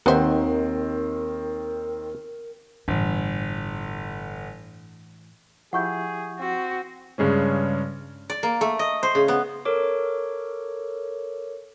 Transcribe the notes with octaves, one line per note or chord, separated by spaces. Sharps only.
D#2 D#3 B3 C4 A#4 C5 E5 F#5
G1 A2 E3
F3 E4 G4 G#4 F#5 C#6 G6
C4 F#4
G2 C#3 G#3 C#4
D5
A#3
A3
D#5
C5
C#3
B3
A4 A#4 C#5 D6